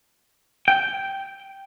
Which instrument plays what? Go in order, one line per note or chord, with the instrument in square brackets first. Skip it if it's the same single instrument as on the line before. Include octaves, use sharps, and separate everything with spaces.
[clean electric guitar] G5